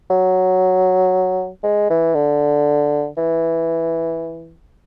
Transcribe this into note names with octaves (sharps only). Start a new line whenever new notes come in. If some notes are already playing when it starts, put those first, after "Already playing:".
F#3
G#3
E3
D3
E3